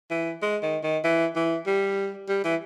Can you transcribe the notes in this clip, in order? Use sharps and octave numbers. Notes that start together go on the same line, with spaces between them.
E3
G#3
D#3
D#3
E3
E3
G3
G3
E3